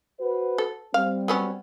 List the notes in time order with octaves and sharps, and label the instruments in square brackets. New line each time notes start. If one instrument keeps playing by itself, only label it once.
[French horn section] F#4 B4 C5
[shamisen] A4
[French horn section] G3 C4 [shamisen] F5
[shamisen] F#3 B3 C#4